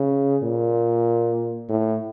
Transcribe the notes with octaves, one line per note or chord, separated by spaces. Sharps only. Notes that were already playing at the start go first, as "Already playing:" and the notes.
Already playing: C#3
A#2
A2